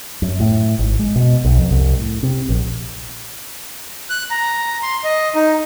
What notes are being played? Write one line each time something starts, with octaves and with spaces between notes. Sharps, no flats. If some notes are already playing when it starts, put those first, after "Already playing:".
F#2
A2
G#1
G#3
B2
B1
F2
C2
A2
C3
A#1
F#6
A#5
C6
D#5
D#4